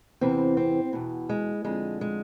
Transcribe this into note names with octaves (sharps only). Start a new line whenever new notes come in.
E2 C3 E3 C4
C4
E2 B2
G#3
F2 D3 G#3
G#3